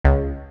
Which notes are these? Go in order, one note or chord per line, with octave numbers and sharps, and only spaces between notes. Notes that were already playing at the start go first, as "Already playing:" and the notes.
C#2